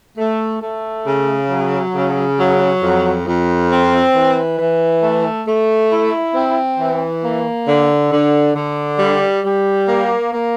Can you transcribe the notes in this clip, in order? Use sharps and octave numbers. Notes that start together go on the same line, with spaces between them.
A3
A3
C#3
F#3
C#3
F#3
F2
F2
C4
E3
E3
A3
A3
E4
C4
E3
A#3
D3
D3
D3
G3
G3
A#3
A#3